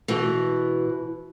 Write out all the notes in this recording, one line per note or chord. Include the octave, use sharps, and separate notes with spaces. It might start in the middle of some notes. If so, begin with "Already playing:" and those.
B2 E3